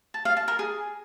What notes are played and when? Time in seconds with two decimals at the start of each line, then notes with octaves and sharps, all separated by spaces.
0.14 A5
0.25 F5
0.37 A5
0.48 A#4
0.59 G#4